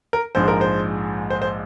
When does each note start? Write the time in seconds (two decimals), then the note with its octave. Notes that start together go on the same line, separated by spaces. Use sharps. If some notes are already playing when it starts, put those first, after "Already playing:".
0.13 A#4
0.35 A#1 G#2 F3 G#3 C5
0.48 A#4
0.61 C5
1.30 C5
1.42 C5